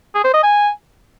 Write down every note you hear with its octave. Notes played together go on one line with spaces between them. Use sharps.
G#4
C5
D#5
G#5